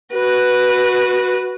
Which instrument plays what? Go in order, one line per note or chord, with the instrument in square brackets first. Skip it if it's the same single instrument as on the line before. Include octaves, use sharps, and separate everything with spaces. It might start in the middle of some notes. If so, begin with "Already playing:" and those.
[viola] F#4 B4